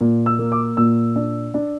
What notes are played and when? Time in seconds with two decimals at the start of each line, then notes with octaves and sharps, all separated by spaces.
0.01 A#2
0.26 E6
0.39 A#3
0.52 D6
0.77 A#2 E6
1.16 D4
1.54 D4